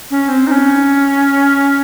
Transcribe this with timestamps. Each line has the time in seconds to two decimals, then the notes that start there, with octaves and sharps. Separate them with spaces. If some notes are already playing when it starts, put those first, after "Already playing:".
0.11 C#4
0.29 C4
0.47 D#4
0.51 C#4